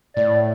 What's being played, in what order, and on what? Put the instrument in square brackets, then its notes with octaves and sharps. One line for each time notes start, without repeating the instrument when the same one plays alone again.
[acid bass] A2 [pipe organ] D5